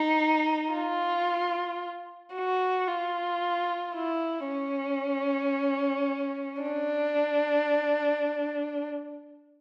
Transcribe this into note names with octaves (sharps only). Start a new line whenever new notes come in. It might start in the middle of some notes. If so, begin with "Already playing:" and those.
Already playing: D#4
F4
F#4
F4
E4
C#4
D4